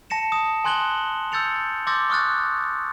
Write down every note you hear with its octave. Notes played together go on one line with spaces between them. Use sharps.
A5 A#6 C#7 E7
D#6 E7
G#5 C6 F#6 G#6 F#7 G7
E6 G6 A6 C#7 F7
C6 D6 E6 G6 A6 A#6
C#6 D#6 F6 F#6 A6